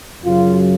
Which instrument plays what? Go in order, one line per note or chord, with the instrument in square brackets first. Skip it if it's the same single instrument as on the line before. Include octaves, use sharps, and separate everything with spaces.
[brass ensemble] F#2 C#3 F#3 F4